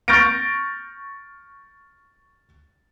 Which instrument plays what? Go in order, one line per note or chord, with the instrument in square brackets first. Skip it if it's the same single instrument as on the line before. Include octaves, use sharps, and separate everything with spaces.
[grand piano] C#6 F6 G6 A6 A#6 D7